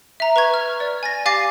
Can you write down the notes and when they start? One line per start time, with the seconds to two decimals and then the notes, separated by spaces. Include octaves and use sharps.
0.20 E5 A#5
0.36 B4 A#5 C#6 G#6
0.54 F6
0.80 D5
1.03 G#5 A6 A#6
1.25 G4 F5 G#5 D6 A6 C7